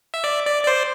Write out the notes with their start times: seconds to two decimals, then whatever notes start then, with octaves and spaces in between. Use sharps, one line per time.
0.14 E5
0.24 D5
0.46 D5
0.63 D5
0.67 C5